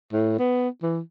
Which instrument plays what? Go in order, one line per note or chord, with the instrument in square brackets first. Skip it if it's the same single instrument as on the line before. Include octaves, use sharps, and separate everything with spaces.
[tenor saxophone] A2
B3
E3